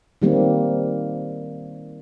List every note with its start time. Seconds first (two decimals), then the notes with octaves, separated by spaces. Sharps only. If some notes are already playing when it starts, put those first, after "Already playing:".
0.22 D#3 G3 A#3 C4